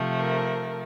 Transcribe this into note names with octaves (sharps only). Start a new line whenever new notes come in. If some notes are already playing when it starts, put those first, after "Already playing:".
Already playing: C3 F3 A3
A#4